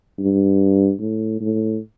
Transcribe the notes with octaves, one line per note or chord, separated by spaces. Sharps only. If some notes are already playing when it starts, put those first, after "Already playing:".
G2
A2
A2